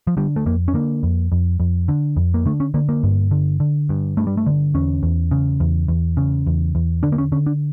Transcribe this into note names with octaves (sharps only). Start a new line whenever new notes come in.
F3
D3 G3
A3
F2 A#3
C#4
D3 A#3
F2
F2
F2
D3
F2
A#3
D3 A3
C#4
D3 A#3
A#3
G2
D3
D3
G2
G2 A3
G3
A3
D3
E2 C#4
E2
C#3
E2
E2
C#3
E2
E2
D3 D4
A#3
C#4
D3 C#4
D4